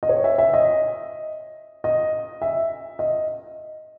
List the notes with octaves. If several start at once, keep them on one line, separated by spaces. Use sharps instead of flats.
D#5
C#5
E5
E5
D#5
D#5
E5
D#5